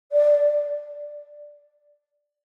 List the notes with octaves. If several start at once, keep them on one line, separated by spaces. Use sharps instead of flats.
D5